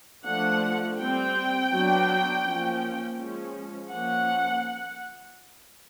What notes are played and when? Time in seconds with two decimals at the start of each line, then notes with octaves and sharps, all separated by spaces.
0.26 F3 A3 D4 F#5
0.99 G3 C4 G5
1.72 F#3 B3 D4
2.45 F3 A#3 C#4
3.17 F3 G#3 C#4
3.90 F3 A#3 C#4 F#5